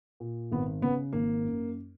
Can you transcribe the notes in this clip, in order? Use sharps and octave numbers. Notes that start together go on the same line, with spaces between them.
A#2
G#1 B3
C#3 B3
G#1 A#3
F#2